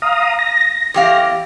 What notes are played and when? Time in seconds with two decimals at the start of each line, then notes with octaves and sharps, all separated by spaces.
0.02 F5 A#5 D#6
0.39 A#6
0.94 E2 G4 F5